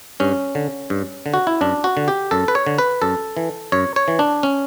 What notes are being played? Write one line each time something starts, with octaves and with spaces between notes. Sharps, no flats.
G2 C#4
D3
G2
D3
F#4
E4
F#2 D4
F#4
D3
G4
F#2 A4
B4
C#5
D3
B4
F#2 A4
E3
F#2 C#5
C#5
E3
D4
C#4